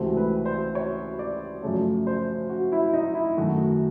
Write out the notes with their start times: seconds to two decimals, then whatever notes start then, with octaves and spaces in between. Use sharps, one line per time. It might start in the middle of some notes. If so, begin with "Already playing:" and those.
Already playing: C#2 C3 E3 A3 C4 F#4
0.17 B4
0.45 C5
0.75 C#5
1.19 D5
1.62 F#2 C#3 F3 A3 C#5
2.07 C5
2.49 F#4
2.72 E4
2.93 D#4
3.15 E4
3.37 F#2 D#3 F#3 A3 F#4